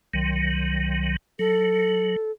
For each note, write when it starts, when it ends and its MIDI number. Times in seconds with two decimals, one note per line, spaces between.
0.14 1.16 36
0.14 1.16 51
0.14 1.16 54
1.39 2.16 54
1.39 2.31 69